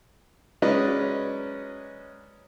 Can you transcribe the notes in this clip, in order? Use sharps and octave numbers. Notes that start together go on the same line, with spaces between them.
F#3 G#3 C#4 B4 D5 D#5